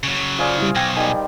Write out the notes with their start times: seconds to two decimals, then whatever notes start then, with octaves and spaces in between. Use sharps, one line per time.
0.03 C#3 F#3
0.39 F4 G#4 C5 D5 F5
0.58 G3 E4
0.75 B1 G5 G#6 A#6
0.96 D#3 G3 G#5